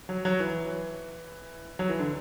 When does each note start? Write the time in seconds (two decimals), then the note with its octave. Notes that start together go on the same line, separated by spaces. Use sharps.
0.09 F#3
0.25 F#3
0.40 E3
1.79 F#3
1.89 E3
1.99 D3